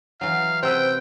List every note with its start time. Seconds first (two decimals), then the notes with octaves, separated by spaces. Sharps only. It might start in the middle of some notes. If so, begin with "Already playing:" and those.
0.21 E3 F#3 F5
0.63 C3 B4 C5 G5 E6